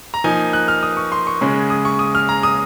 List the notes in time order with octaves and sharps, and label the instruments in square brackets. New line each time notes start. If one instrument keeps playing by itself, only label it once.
[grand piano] A#5
F3 A#3 D#4 G#5
F#6
F6
D#6
C#6
C6
C#6
C#3 G#3 C#4
D#6
C#6
D#6
F6
A#5
D#6